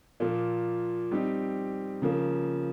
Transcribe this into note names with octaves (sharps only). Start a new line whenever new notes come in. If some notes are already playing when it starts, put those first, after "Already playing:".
A#2 F3 A#3
G3 C4 D#4 G4
C#3 F3 A#3